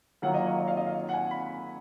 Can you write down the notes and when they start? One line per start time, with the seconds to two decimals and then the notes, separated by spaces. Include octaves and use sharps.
0.22 D#3 F#3 A#3 F4 F#5
0.34 D#5
0.47 C#5
0.58 D#5
0.68 F5
0.77 D#5
0.87 F5
1.09 F#5
1.13 G#5
1.31 B5